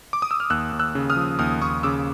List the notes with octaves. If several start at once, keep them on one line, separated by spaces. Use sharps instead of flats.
D6
D#6
E6
F6
D#2 E6 F#6
D#2
E6 F#6
C#3
D#6 F6
F3
D#2 D#6 F6
D#2 C#6 D#6
C#3 D6 E6